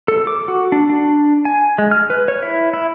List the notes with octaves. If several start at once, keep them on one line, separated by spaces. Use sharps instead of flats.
A4
D6
F#4
D4
D4
G#5
G#3
F6
B4
C#5
E4
E4